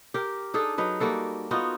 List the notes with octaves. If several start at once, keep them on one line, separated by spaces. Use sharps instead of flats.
G4 A#4
D4 D#4 G#4 A4
F#3 D#4 B4
G3 A#3 F#4 A4
B3 D#4 F4 F#4